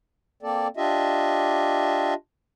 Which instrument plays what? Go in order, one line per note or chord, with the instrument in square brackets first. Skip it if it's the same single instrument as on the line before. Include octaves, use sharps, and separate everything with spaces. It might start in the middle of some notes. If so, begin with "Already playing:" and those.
[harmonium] A#3 C4 A4 D5
D4 F4 G4 D#5 E5